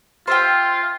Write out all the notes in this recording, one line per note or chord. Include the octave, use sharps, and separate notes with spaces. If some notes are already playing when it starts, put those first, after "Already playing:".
F4 C5 E5 G5